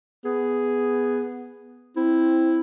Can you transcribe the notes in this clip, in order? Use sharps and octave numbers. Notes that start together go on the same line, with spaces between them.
B3 G#4
C4 E4